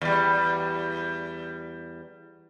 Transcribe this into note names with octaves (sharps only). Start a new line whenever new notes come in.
E2 G3